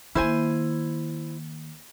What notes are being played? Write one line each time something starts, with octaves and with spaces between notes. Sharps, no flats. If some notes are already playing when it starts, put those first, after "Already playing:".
D#3 A#3 E4 C5 G#5